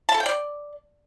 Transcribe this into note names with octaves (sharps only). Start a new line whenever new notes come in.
A5
A4
G5
D5